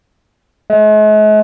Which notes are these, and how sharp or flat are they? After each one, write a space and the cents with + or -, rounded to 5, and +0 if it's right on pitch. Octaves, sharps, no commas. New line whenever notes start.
G#3 +45